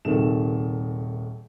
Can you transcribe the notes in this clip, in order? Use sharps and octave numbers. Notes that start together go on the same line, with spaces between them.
D#1 C3 D#3 G#4 A4 E7